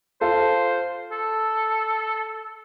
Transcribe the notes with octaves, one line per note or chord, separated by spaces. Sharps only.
F4 A4 C5
A4